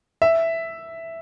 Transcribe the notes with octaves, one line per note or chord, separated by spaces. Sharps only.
E5